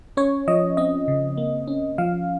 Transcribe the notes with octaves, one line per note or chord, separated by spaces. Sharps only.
C#4 C#5
F3 D#5
C4 D#5
C#3
A#3
C#4
F3 F5